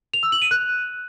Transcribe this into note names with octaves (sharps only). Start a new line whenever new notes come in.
F7
E6
F#7
D#7
F#6